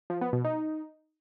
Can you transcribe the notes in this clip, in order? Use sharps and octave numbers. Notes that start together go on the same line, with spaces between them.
F3
B3
B2
D#4